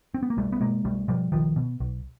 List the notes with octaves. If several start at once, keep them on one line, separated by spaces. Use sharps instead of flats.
C4
B3
A#3
B1 G3 A3
B3
B2 G#3 A#3
B1 G3 A3
B2 F3 G3
B1 D#3 F3
B2
B1